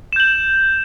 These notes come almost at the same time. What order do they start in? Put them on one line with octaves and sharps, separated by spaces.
E7 G6 F#7